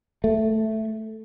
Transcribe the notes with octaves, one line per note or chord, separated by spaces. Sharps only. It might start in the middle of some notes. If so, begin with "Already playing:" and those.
A3